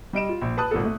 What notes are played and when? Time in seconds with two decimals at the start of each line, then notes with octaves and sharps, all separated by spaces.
0.13 G3 D#5 D7 E7
0.29 F4
0.42 A#1
0.57 B4 A5 D#6 F#6
0.71 G#1 A#2 A#3 A4
0.84 A3